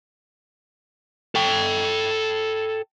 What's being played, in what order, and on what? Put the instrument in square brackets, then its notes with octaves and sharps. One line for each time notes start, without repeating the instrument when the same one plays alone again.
[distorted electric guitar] A4 G5